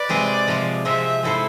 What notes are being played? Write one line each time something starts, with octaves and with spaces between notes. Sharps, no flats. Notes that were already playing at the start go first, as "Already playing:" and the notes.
Already playing: B4 D5
C3 G#3 C4 G#4
C3 F3 G#3
C3 F3 G#3 C5 E5
G#3 C4 E4 A4 C5